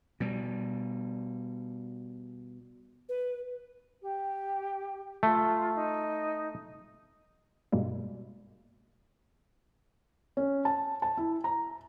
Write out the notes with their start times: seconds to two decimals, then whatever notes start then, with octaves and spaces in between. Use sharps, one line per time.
0.20 B2 G3
3.09 B4
4.02 G4
5.23 A3 F4
5.75 D#4
7.72 G2 B2 G3 G#3 A#3
10.37 C#4
10.65 A5
11.02 A5
11.17 E4
11.44 A#5